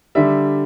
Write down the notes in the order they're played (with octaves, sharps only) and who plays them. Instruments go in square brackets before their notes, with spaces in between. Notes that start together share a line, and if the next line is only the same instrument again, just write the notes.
[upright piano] D3 G3 E5